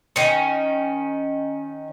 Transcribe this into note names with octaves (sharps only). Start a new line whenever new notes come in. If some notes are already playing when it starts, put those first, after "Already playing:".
D#3 C#4